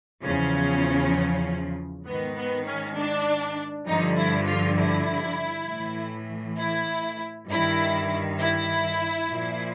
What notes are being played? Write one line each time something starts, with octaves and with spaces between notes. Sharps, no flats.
E2 C#3 F3 C#4
G#2 D#3 B3
B3
C#4
D4
G2 D3 F3 D#4
E4
F4
E4
A2 E3
E4
G2 D#3 E4
E4
A#2 F3